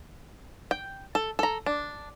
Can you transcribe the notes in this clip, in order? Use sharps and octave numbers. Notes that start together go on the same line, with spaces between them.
G5
A4
A4 A#5
D4